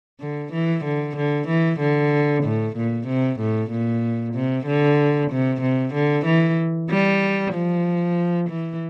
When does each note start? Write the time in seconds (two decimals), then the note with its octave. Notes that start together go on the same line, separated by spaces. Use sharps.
0.20 D3
0.53 E3
0.85 D3
1.17 D3
1.48 E3
1.80 D3
2.44 A2
2.76 A#2
3.07 C3
3.40 A2
3.71 A#2
4.34 C3
4.66 D3
5.31 C3
5.62 C3
5.94 D3
6.26 E3
6.90 G3
7.54 F3
8.49 E3